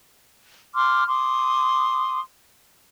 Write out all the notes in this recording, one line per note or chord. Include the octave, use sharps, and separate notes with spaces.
C6 D6 D#6 F6
C6 D6 D#6